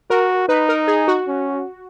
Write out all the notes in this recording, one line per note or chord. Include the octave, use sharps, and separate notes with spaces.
F#4 A#4
D#4 B4
A#4
G#4
F#4
C#4